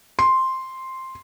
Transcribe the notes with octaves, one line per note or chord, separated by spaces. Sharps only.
C6